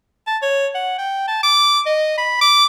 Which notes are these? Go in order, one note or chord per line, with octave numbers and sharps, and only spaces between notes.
A5
C#5
F#5
G5
A5
D6
D#5
B5
D6